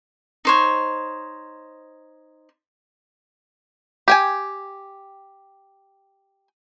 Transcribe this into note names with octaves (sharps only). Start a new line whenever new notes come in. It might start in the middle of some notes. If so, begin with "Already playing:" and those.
D#4 C5 C#5
G4 G5 G#5